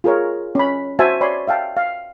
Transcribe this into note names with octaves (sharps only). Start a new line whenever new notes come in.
F4 G#4 A#4 C#5
C#4 B5
F#4 C5 E5 G#5 A5
C#5 D5 G#5 B5 C6
E5 F5 G5 A5
F5